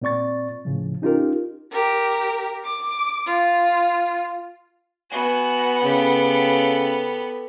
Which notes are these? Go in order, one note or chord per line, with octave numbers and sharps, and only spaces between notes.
A#2 C4 D5 C#6 A6
A2 C#3 F3
C#4 D#4 F4 G4 A#4
G4 A#4
D6
F4
B3 F#4 G#5
C#3 G4 A4